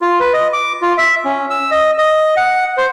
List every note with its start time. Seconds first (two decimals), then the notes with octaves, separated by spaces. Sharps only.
0.01 F4
0.20 B4
0.33 D#5
0.53 D6
0.82 F4
0.97 E5
1.25 C#4
1.50 E6
1.71 D#5
1.98 D#5
2.37 F#5
2.77 C5